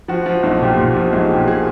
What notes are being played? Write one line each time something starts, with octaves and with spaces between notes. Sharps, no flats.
F3 F#4
F3
B1
A#2 G4
A#2
F3
B1 G#4
A#2 G4
G#4